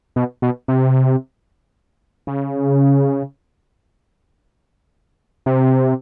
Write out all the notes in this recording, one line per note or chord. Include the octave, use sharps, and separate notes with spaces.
B2
B2
C3
C#3
C3